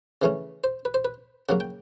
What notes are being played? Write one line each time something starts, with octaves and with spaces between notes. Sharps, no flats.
C#3 E3 A3 C#4
C5
B4
C5
B4
C#3 F#3 A#3 F#5
G5